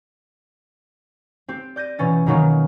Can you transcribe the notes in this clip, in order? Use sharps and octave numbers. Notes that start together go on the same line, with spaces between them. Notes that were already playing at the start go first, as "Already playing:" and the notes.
C4 G4
D5 G6 A#6 D#7
B2 E3 C#4 A6
B2 D#3 F#3 A#3 C#4